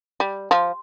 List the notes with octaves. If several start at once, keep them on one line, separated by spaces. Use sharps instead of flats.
G3
F3